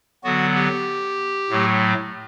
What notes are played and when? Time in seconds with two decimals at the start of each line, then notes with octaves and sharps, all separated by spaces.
0.24 D3 F#3 B3 F#4
0.55 G4
1.50 A2 F#3 A3